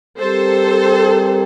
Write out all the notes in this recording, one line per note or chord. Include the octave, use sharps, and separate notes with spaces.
G3 C4 G4 A4 A#4 C5